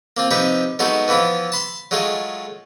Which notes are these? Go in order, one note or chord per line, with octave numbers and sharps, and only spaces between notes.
A#3 C4 F4
C3 F3 D#4 G4 B4
F#3 G#3 A3 B3 D#4 F#4
E3 F3 B3 E4 F4
A5 B5 C6
F#3 G#3 A3 F4 G#4